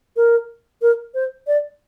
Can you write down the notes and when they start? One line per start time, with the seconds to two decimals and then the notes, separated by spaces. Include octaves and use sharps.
0.16 A#4
0.82 A#4
1.14 C5
1.47 D5